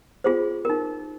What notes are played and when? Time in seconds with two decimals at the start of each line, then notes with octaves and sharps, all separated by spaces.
0.24 F4 G#4 C5
0.65 D#4 A#4